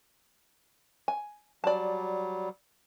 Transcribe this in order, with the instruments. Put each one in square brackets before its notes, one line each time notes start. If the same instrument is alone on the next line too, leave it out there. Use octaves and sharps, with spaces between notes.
[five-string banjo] G#5
[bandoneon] F#3 G3 [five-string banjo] D5 A5